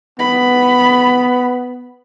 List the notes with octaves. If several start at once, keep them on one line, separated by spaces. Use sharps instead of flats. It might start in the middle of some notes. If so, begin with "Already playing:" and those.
B3 B5